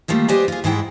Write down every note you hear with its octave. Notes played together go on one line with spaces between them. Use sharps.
D#3 F3 G3 A3 A#3
G4 B4 C5 D5 D#5 G#5
F4 G#4
G#2 D#3 G#3 E4 F#5 G5